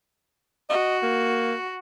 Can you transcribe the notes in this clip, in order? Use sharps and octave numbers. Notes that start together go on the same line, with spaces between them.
F#4 D#5
A#3